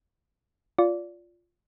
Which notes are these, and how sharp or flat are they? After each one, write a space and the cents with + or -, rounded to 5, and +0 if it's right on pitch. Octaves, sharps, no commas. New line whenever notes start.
F4 +0 D5 -20